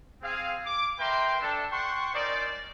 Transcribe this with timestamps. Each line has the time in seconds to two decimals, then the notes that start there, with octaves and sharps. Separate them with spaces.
0.22 C4 G#4 F5
0.65 D6
0.98 A#4 B4 E5 G5 A#5 C6
1.41 D4 A4
1.71 F#5 G5 C6 C#6
2.14 C#4 D#4 A#4 C5 D5